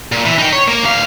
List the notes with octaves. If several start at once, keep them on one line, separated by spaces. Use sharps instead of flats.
A#2
E3
D#4 G5
C#5
A#3
D2 F5